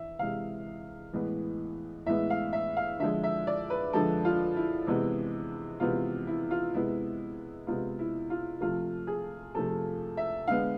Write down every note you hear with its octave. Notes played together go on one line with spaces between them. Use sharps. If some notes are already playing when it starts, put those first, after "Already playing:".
Already playing: E3 E5
C3 E3 G#3 F5
A2 E3 G#3 B3
A2 E3 G#3 B3 E5
F5
E5
F5
D3 F3 G#3 E5
E5
D5
B4
D3 F3 G#3 A4
F4
E4
C3 E3 G#3 B3
C3 E3 G#3 B3 F4
E4
F4
C3 G#3 B3 E4
C3 G#3 B3 F4
E4
F4
C3 F3 A3 F4
G#4
C3 F3 A3 A4
E5
D3 G#3 B3 F5